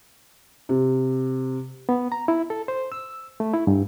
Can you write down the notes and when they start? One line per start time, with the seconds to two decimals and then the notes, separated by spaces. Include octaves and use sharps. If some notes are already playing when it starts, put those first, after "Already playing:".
0.69 C3
1.89 B3
2.12 A#5
2.28 E4
2.50 A4
2.68 C5
2.92 E6
3.40 A3
3.53 E4
3.67 G2